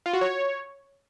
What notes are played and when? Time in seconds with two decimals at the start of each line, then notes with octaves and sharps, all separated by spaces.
0.06 F4
0.14 F#4
0.21 C#5